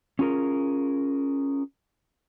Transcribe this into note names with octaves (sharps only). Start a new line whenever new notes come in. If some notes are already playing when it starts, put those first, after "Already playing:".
C#4 F4 G#4 A#4